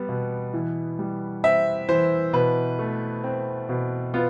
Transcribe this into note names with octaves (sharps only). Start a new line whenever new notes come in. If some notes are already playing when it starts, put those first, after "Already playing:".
Already playing: G3 B3
B2
E3
G3
C4 E5
E3 C5
B2 B4
A3
C4
B2
B3 F4